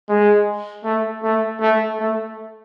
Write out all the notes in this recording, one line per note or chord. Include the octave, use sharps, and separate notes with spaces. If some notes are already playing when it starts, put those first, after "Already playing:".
G#3
A3
A3
A3
A3